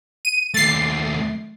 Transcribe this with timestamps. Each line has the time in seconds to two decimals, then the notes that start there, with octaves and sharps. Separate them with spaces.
0.25 D#7
0.54 D#2 A3 A6 C7